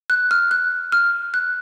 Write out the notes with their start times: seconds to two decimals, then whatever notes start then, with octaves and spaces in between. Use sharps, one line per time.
0.10 F#6
0.31 F6
0.51 F#6
0.92 F6
1.34 F#6